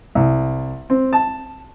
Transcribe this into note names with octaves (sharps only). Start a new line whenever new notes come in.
C2
C4
A5